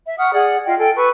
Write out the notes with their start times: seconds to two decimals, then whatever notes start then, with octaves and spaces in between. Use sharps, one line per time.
0.05 E5
0.19 F#5 C#6 D#6 F6
0.33 G#4 D5 F#5
0.66 F4 D#5 F5 G5
0.78 A4 G5 G#5
0.96 B4 C#6 E6